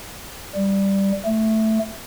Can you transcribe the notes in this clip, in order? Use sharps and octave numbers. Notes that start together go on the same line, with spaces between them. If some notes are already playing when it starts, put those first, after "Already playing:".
G3
A3